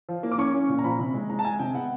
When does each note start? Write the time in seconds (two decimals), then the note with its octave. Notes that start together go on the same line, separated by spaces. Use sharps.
0.09 F3
0.23 A#3
0.32 D6
0.38 C#4 C#6
0.53 C#4
0.69 A#2
0.79 A#5
0.84 F3 B5
0.99 C3
1.14 G#3
1.29 G#3 A#5
1.39 A5
1.45 G#3 G#5
1.59 C3 G5
1.74 B3 F#5